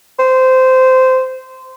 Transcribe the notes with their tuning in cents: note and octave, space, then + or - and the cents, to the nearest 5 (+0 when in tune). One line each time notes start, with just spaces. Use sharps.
C5 -15